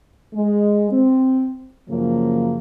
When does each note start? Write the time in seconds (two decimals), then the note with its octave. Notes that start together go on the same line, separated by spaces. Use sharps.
0.35 G#3
0.91 C4
1.89 F#2 C#3 F3 A#3